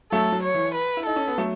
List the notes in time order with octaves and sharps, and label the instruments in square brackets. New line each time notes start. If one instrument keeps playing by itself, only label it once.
[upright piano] F#3 A3 [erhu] A4
[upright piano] F#3
[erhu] C#5
[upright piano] E3
[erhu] B4
[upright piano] E4
[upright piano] D#4 [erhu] A4
[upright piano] C#4
B3
F#3 A3